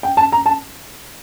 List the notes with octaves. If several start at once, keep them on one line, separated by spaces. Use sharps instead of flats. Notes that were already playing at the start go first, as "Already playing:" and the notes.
G5
A5
A#5
A5